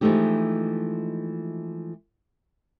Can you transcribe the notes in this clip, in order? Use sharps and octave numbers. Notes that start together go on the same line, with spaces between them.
E3 F3 G#3 A3 D#4 G4